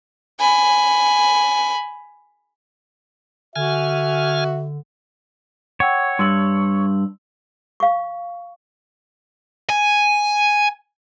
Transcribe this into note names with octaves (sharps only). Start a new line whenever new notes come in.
G#5 B5
D3 F#4 E5 G#5 F6
C#5 F#5 G5 E6
G2 C6 E6 F#7
F5 C#6
G#5